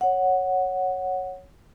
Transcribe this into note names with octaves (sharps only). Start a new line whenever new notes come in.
C#5 F#5